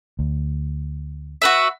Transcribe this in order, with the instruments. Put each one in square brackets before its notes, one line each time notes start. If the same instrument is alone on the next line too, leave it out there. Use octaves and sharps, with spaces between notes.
[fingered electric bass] D2
[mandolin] F#4 B4 E5